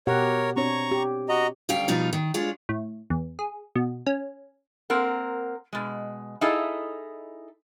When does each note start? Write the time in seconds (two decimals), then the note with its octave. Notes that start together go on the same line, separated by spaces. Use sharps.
0.07 B2 G4 A#4 C#5 F#5
0.56 C4 D4 C#5 A#5 C#6
0.92 G4
1.29 F#4 D#5 A#5
1.69 D2 C#3 G3 F5 G5
1.88 B2 F3 G3 D#4 F4
2.13 D#3
2.34 G#3 D4 F4 C#5
2.69 A2
3.10 E2
3.39 G#4
3.75 B2
4.06 C#4
4.90 A#3 C4 A#4 F#5
5.73 B2 G#3
6.41 D#4 E4 G#4 A4 D#5 F5